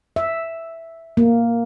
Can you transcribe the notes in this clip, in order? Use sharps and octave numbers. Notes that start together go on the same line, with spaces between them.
E5
A#3